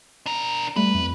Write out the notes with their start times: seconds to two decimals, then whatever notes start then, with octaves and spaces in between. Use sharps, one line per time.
0.26 D4 A#4
0.76 G3 A3 B4
0.94 F2